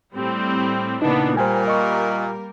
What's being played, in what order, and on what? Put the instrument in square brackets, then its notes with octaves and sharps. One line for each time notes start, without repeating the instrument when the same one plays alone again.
[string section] A2 G3 C4
[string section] A#2 B3 D4 [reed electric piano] C#3 D#4 [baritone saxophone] E3
[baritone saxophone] A#2 [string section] G3 A#3 A#4 [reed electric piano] C5 G5 G#5
[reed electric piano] D#5 C#6